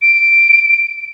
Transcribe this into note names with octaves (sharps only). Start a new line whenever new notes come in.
D7